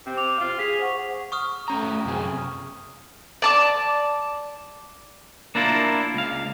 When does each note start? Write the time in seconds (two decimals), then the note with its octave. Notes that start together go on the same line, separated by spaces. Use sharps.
0.05 C3 C4
0.17 D6 F7
0.39 F4 F5
0.59 G#4 B6 F7
0.79 C5 F#5 C#6
1.32 C#6 D#6 F6
1.68 A3 C#4 A#5
2.05 F#2 C3 G#4
3.42 D5 A5 D6
5.55 A#3 D4 E4 F4 A#4
6.14 C#2 F5